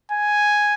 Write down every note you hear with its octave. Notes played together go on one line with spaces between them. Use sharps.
G#5